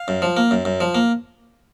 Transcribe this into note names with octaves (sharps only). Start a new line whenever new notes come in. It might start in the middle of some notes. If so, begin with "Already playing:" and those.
Already playing: F5
F#2
F3
A#3
F#2
F#2
F3
A#3